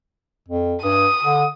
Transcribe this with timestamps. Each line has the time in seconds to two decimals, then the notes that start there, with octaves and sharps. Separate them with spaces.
0.48 F2
0.83 G2 D#6
1.23 D3